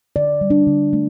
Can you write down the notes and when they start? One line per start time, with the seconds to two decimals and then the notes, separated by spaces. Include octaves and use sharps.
0.16 D3 D5
0.41 G3
0.50 D4
0.67 D3
0.93 A3